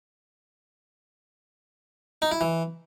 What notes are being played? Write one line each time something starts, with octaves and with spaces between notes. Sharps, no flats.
D#4
E4
E3